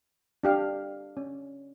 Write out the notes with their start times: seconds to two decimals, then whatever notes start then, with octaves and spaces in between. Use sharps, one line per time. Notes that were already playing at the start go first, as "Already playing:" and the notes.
0.43 D4 G4 F5
1.17 C#4